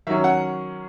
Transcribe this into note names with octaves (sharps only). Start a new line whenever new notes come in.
D#3 F#3 C#4 E5
F#5